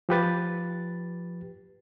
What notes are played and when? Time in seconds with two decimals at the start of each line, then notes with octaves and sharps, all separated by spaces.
0.09 F3 G4 B4 A6